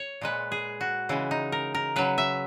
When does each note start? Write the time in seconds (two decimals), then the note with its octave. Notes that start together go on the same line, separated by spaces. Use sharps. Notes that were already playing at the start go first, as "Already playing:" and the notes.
Already playing: C#5
0.21 A#2 G#3 B4
0.52 G#4
0.81 F#4
1.09 C#3 E3 G#3 E4
1.31 D#4
1.52 A#4
1.74 A#4
1.96 C#3 F#3 B4
2.18 E5